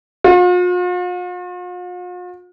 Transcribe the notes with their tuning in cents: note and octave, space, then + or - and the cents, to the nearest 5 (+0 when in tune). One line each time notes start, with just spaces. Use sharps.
F4 +45